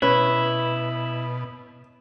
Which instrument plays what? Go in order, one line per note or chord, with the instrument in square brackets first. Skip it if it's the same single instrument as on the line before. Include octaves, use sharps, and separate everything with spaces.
[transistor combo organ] B2 [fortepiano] C#4 [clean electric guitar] E4 [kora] B4